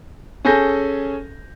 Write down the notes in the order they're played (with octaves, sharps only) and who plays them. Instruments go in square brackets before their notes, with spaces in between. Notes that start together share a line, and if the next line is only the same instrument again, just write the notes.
[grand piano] C#4 G#4 A4 G#5 G6 A#6